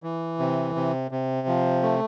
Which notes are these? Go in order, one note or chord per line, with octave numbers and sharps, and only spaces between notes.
E3
C3
C3
C3
F3
A3